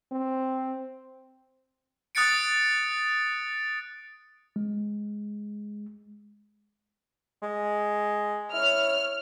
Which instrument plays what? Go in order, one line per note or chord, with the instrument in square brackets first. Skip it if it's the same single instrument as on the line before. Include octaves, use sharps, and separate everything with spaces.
[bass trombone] C4
[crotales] D#6 F#6 A6 C#7 D7
[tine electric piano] G#3
[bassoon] G#3
[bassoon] E4 [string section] C#5 F6